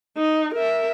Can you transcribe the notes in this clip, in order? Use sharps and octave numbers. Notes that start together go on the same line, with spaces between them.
D#4
A#4 E5